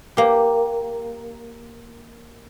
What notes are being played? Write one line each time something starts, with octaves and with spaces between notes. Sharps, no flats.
A#3 G4